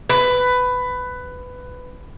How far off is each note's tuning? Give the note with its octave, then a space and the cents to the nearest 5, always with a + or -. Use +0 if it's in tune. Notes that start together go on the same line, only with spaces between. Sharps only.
B4 +15